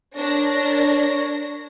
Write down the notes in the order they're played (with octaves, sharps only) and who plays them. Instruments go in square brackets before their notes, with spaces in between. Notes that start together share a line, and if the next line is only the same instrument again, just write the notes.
[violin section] D4 A#4 A#6 [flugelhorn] C#5